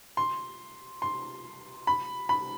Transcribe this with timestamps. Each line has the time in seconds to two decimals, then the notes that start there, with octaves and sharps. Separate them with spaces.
0.17 C6
1.02 C6
1.87 B5
2.29 B5